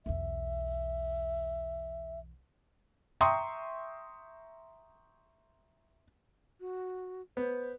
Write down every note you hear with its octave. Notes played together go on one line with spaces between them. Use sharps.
B1 E2 E5
E5 G5 A#5 C6 C#6 D#6
F#4
B3 C5